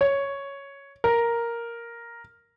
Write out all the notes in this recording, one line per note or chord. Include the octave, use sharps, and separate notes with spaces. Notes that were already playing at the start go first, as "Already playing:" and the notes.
C#5
A#4